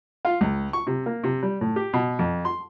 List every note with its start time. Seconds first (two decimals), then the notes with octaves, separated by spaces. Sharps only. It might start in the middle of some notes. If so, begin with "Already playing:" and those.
0.25 F4
0.41 C#2
0.73 C#6
0.87 C3
1.06 A#3
1.24 C3
1.43 G3
1.61 A2
1.76 G4
1.93 B2
2.19 F2
2.45 C6